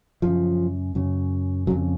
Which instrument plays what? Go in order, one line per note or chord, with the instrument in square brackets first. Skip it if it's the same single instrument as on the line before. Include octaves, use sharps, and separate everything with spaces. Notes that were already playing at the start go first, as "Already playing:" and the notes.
[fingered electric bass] F#2 C#3 F3
F#2 C#3
C#3 F#3
F2